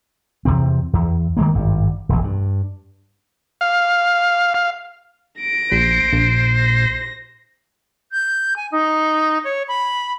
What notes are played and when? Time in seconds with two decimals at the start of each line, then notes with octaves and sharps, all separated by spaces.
0.45 E2 C3 C4
0.93 E2
1.37 D#3 G#3 A#3
1.55 G#1 G2
2.09 E1 A#1
2.24 G2
3.61 F5
4.54 F5
5.39 A#6 D7
5.72 A#1 C5
6.12 A#1
6.58 A#6
8.11 G6
8.56 G#5
8.72 D#4
9.44 C#5
9.68 B5